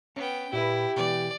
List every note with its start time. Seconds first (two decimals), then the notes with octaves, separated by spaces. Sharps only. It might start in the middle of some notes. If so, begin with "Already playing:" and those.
0.16 B3 C#4 G5
0.53 A#2 E4 G4 B4
0.96 B2 E3 D5